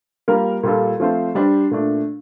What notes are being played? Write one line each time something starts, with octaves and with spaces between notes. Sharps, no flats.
G3 A#3 F4 A#4
A#2 G3 A#3 F4 A4
F3 A3 C4 F4 C5
G3 D4 G4 C5
A#2 A3 D4